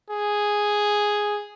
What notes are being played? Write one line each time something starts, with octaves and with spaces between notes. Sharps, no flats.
G#4